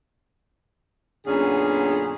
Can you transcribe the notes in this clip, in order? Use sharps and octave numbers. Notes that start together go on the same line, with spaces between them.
F#2 A#2 D3 B3 C#4 G#4